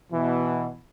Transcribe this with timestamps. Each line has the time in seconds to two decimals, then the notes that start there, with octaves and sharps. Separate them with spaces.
0.12 B2 E3